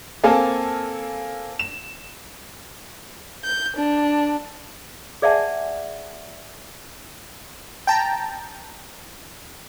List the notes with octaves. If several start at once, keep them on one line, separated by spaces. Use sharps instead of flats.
A#3 C4 A4 F5 G#5 A5
E7
G6
D4
G#4 D5 E5 F#5 G#5 A5
G5 A5 A#5